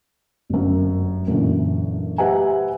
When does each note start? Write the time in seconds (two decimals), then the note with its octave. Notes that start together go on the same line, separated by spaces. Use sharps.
0.50 G1 F#2
1.28 F#2 A#2 D3 E3
2.18 G4 B4 E5 F#5 G#5